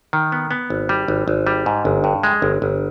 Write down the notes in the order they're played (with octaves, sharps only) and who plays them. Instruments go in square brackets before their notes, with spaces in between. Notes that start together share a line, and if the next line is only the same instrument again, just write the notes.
[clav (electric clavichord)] D#3
B3
B3
G#1
G3
G#1
G#1
G3
G#2
G1
G2
G#3
G1
G1